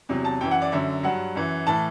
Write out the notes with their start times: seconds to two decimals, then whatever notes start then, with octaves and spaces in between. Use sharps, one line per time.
0.09 E2 C3 F#3
0.25 A5
0.41 F#2 E3 G5
0.51 F#5
0.62 D5
0.72 F#2 D3 F#3 E5
1.03 G2 F#3 F#5
1.35 F#2 E3
1.67 A2 E3 A5